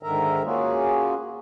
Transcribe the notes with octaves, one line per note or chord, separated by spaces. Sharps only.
G#2 D3 D#3 A#4 E5 A#5
A#3 C#4 F4 F#4 G#4